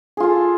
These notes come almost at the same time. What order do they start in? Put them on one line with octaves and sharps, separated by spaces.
G#4 F4 A4